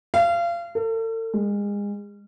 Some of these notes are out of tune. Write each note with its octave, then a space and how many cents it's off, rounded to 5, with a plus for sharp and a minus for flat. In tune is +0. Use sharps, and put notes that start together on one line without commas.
F5 -30
A4 +40
G#3 -30